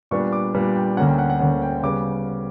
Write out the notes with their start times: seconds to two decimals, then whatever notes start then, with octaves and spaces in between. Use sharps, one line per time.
0.11 A#2 G3 B3 D4 C#6
0.33 D6
0.54 A#2 G3 B3 D4
0.75 G5
0.97 D2 D3 A#3 C#4 F#5
1.08 G5
1.18 F#5
1.30 F#5
1.40 D2 D3 A#3 C#4 F#5
1.62 G5
1.83 C#3 G3 B3 D6